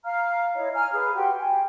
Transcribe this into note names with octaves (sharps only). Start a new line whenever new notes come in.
F5 A#5 F6
E4 C#5 D#5
G#5 A#5 F6
G#4 B4 F5
F#4 G4 G5 C6
G5 G#5